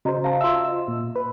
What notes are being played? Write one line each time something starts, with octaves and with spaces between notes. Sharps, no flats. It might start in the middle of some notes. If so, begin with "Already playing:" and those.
C#3 F#4 C5 D#5 A#5
F5 A5
F4 E5 C6 E6
D#5
A#2
B4